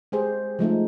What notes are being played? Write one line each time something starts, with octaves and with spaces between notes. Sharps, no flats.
G#3 G4 G#4 C5
F3 G#3 A3 D#4